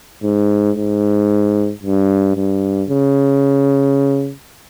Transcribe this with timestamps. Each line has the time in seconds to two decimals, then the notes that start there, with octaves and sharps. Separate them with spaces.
0.23 G#2
0.76 G#2
1.83 G2
2.36 G2
2.89 C#3